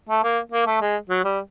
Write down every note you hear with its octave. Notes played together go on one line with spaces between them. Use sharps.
A3
A#3
A#3
A3
G#3
F#3
G3